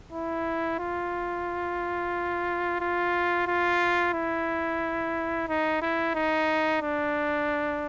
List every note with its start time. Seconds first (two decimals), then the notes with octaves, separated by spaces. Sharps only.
0.12 E4
0.79 F4
2.81 F4
3.47 F4
4.13 E4
5.48 D#4
5.82 E4
6.15 D#4
6.81 D4